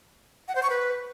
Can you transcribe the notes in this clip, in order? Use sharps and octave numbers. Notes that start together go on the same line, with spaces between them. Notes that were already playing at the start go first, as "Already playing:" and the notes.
F#5
C5
C#6
B4